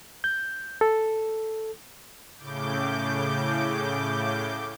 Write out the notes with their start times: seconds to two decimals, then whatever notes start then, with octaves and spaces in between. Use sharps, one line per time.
0.24 G6
0.81 A4
2.38 A2 C#3 D6 G6